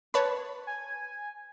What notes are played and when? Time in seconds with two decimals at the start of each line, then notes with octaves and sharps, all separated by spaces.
0.14 B4 C#5 A5 B5
0.67 G#5